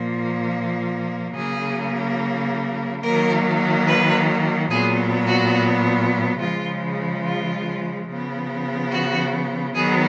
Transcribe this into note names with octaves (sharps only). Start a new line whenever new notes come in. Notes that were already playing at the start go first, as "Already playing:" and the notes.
Already playing: A#2 F3 A#3
C#3 F#3 A#3 G#4
D#3 F#3 A#3 A#4
B4
A#2 F#3 B3 G#4
F#4
C#3 F3 G#3 F4
F4
C#3 F3 B3
F#4
D#3 F#3 B3 G#4